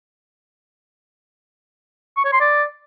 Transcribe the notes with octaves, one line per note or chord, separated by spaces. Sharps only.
C#6
C#5
C6
D5